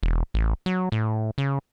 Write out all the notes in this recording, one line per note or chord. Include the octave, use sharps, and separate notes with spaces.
E1
A1
F#3
A2
C#3